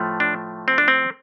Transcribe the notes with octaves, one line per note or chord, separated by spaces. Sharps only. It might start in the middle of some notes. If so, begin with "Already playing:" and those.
Already playing: A2 F3 A3
D4
C4
D4
C4